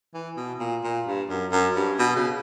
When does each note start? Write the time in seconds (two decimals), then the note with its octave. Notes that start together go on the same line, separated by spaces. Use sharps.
0.14 E3
0.37 B2
0.60 A#2
0.84 A#2
1.06 G2
1.29 F#2
1.52 F#2
1.76 G2
1.99 B2
2.16 C#3